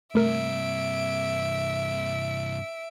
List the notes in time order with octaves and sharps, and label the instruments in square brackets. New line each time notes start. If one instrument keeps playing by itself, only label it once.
[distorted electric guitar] G2 C3 [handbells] A3 A#4 [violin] E5 D7